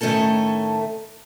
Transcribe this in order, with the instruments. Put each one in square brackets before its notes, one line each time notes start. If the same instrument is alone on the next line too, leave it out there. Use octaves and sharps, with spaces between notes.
[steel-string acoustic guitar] A2 D#3 A3 C#4 A4 A5